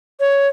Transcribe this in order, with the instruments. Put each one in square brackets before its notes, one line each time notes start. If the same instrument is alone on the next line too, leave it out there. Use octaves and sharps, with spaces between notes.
[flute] C#5